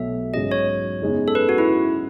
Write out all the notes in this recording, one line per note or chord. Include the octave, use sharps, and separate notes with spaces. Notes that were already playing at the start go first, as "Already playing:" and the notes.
Already playing: B1 B2 F#3 A3 E5
G#2 F#3 C#4 G#4 D#5
C#5
F#2 C#3 G#3 B3 D#4
A4
B4
F#4
E4